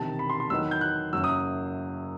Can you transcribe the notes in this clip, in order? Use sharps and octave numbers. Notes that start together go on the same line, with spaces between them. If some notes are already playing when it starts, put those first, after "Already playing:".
Already playing: E1 E2 C3 D#3 A5
B5
C6
C6
E2 D#3 F#3 B3 D#4 E6
G6
F#6
F#1 F#2 F#3 E6
D#6